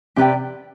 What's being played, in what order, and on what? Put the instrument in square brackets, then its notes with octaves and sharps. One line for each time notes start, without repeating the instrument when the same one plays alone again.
[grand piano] C3 [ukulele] G4 B4 D5 G5